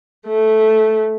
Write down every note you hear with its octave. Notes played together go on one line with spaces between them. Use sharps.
A3